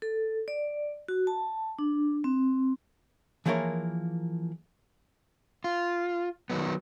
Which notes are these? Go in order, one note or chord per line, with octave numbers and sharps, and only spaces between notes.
A4
D5
F#4
A5
D4
C4
E3 F3 A#3 G#4 A#4 C#5
F4
D#3 F#3 B3